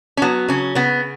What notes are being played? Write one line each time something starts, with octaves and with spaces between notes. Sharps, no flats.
C#4
F#3 B3
C#3 C#4
C#3 B3